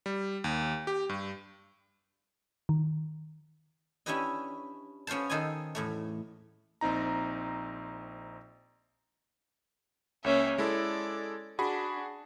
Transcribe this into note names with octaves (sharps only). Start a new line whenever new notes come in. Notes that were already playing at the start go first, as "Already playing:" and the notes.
G3
D#2
G4
G2
D#3
C#4 D4 E4 G4 B4 D#5
B3 C#4 F4 C5 A5
D#3 A4 C5 D#5 G#5
E2 A2 A3
A#1 C4 D#4 A#5
C#2 A#3 C#4 E5
G#3 E4 A4 D5
D4 F#4 G#4 B5